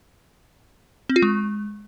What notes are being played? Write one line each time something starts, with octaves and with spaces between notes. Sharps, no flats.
C4
F4
G#3